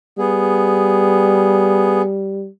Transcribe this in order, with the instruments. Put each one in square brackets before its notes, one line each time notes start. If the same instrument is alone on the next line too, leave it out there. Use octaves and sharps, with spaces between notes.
[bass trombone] G3 [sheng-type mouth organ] B3 G#4